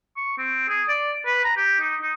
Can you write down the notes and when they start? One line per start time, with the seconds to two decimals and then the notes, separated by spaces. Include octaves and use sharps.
0.17 C#6
0.38 C4
0.68 G#4
0.89 D5
1.26 B4
1.44 A#5
1.57 G4
1.80 D#4
2.02 D#4